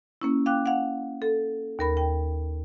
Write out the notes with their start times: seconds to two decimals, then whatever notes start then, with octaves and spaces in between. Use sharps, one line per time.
0.22 A#3 C#4 E4
0.46 F5 G5 D6 F#6
0.66 F5 F#5
1.22 A4
1.79 D#2 A#4 B5
1.97 G5